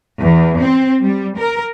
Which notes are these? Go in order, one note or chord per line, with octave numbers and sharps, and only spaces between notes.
E2
C4
G3
A#4